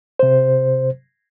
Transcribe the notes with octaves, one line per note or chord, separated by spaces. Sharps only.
C3 C5